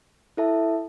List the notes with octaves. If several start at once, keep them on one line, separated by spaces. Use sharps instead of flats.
E4 A4 E5 A5